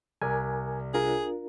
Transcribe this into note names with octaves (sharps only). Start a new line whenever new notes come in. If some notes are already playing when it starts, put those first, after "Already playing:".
C2 A#4 D5 G#5
D4 F4 G#4 A#4